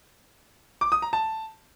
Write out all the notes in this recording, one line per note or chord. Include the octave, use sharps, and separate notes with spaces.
D6
D#6
A#5
A5